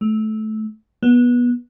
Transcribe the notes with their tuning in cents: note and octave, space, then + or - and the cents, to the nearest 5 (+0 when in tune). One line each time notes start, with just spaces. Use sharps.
A3 -20
B3 -20